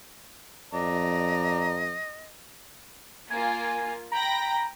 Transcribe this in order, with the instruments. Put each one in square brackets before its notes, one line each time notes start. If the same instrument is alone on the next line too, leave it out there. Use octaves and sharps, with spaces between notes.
[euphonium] F2 [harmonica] D5 A#5 [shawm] D#5
[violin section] A#3 F4 [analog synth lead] G#5
[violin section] G5 B5 A#6 [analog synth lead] A#5